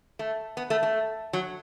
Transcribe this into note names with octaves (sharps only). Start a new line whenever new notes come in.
A3
B3
A3
A3
F#3